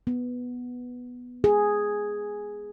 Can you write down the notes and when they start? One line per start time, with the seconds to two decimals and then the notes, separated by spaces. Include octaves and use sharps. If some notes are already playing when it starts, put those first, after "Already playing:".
0.07 B3
1.44 G#4